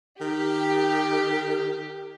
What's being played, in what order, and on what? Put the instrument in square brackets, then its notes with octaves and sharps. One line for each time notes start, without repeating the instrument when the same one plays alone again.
[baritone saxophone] D#3 [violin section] G4